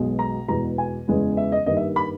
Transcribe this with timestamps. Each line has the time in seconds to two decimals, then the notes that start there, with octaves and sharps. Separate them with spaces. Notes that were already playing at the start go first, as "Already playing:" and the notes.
Already playing: B1 B2 G#3 B3
0.19 A#5
0.48 E2 B2 G#3 A#5
0.78 G#5
1.08 E2 C#3 G#3 B3
1.37 E5
1.52 D#5
1.66 G2 D#3 A#3 D#5
1.77 E5
1.96 B5